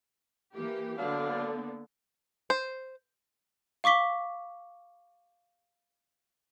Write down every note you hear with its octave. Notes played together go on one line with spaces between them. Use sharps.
E3 A#3 G4
D3 F#3 A#3 B3 D4 F5
C5
F5 C#6 D6 B6 G7